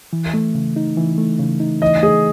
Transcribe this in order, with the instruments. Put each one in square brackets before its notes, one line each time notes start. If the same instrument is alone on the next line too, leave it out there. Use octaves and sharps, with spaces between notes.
[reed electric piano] E3
A3
C#3
D#4
E3
A3
C#3
D#4
[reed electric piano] E3 [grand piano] D#5
[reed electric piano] A3 [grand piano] G#4